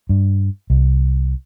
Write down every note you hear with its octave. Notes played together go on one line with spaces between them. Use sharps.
G2
C2